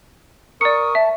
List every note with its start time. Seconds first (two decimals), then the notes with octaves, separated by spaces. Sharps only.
0.61 A#4 D5 C#6 D#6 C#7
0.95 E5 A5